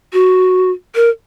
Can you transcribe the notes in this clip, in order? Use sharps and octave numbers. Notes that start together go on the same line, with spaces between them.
F#4
A#4